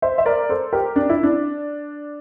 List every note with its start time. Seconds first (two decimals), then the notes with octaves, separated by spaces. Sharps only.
0.02 C5 E5
0.18 E5
0.26 A#4 D5
0.49 A4 C5
0.73 G4 A#4
0.96 D4
1.09 E4
1.23 D4